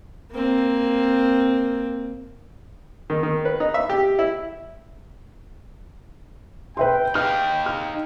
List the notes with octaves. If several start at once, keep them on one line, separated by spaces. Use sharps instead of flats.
A#3 C4
D#3
D#3
B4
D#4
E5
G4
E4
B4 E5 G5 C6
D#4 F5 F6
F6